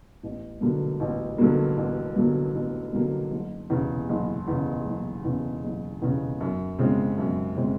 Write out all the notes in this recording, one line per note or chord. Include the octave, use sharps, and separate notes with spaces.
A1
G2 D3 F#3 A#3
A1
G2 D3 F#3 A#3
A1
G2 D3 F#3 A#3
A1
G2 D3 F#3 A#3
F#1
E2 C#3
F#1
E2 C#3
F#1
E2 C#3
F#1
E2 C#3
F#2
C#3 F3 G#3 C4
F#2
C#3 F3 G#3 C4